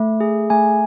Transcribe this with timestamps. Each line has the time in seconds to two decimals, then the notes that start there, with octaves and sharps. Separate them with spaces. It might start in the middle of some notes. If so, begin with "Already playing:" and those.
Already playing: A3
0.20 G#4
0.50 A3 G#5